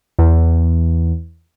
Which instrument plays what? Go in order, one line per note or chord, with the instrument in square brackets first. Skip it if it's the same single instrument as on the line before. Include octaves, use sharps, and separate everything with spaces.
[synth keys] E2